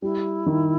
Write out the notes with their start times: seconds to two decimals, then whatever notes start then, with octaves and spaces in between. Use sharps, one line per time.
0.02 G3 E4
0.46 D#3